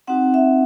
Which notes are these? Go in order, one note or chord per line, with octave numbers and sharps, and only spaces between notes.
C4 D#4 F#4 F#5
E5